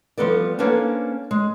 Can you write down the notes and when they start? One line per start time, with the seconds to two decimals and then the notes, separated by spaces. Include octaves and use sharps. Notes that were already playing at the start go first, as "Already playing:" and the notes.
0.18 F3 G3 B3 A4 B4 D5
0.59 A#3 C#4 D4 A4 B4 C5
1.31 G#3